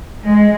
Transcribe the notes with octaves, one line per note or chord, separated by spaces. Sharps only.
G#3